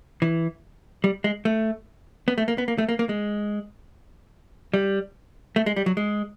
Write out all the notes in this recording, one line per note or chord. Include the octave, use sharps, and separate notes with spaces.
E3
G3
G#3
A3
B3
A3
A#3
B3
A#3
A3
A#3
A#3
G#3
G3
A3
G#3
G3
F#3
G#3